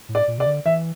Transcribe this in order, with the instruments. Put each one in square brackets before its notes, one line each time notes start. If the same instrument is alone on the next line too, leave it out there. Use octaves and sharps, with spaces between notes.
[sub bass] A2
[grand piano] D5
[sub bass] A#2
[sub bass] C3 [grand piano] D5
[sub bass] D3
[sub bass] E3 [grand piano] E5